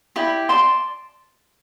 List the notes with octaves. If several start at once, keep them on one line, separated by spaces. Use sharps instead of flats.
E4 G4 D5
D5 A5 C6